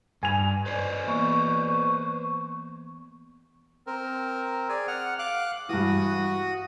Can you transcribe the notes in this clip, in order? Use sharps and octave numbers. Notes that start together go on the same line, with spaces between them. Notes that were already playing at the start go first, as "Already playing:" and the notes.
G2 G#5 F7
B4 C5 D5
E3 A#3 B3 C#6
C4 A#4
G#4 D5 G#5
F#5 F6
F5 D6 F#6
G2 E3 F#4 D#6